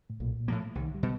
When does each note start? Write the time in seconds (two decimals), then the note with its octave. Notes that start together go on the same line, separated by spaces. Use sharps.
0.10 A2
0.20 B1 A#2
0.48 A2 F3 A#3
0.75 C2 D#3
0.94 G3
1.03 B2